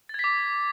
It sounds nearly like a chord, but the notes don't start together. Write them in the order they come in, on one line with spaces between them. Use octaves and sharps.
A6 G#6 B6 D6